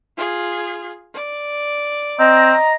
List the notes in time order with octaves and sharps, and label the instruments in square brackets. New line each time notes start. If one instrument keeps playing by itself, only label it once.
[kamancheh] F4 G#4
D5
[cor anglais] C4 [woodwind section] D#5 A#5